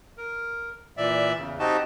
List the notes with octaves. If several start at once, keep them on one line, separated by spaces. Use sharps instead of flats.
A#4
A#2 E3 D5 E5
E2 C#3
C4 D#4 F#4 G4 D#5 A5